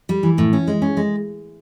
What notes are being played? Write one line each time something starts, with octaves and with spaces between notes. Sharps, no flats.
G3
E3
A2
C#4
G#3
C#4
G#3